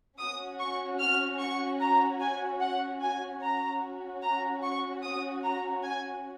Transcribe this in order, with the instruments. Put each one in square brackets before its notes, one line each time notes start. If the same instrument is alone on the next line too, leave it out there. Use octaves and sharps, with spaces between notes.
[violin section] C#4 F#4 D#6
C#6
F6
C#6
A#5
G#5
F#5
G#5
C#4 F#4 A#5
A#5
C#6
D#6
A#5
G#5